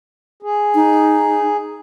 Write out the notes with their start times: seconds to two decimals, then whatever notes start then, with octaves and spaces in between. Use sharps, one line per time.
0.42 G#4
0.75 D#4